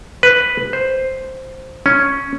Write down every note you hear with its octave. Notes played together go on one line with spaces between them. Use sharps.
B4
C5
C#4